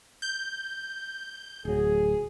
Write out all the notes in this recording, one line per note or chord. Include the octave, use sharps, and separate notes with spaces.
G6
D1 F#3 G#4